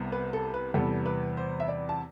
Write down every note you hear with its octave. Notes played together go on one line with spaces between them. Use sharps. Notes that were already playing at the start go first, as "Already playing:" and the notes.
Already playing: C2 C3 B3
B4
A4
B4
E2 C3 G3 B3 A4
B4
C5
E5
D5
A5